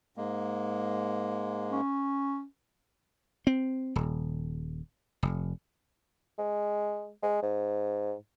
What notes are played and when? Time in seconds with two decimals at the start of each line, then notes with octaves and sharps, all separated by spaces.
0.17 G#2 G#3 A#3
1.72 C#4
3.47 C4
3.96 D#1
5.23 F1
6.38 G#3
7.23 G#3
7.43 G#2